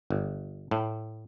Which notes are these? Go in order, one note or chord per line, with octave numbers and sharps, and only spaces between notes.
G1
A2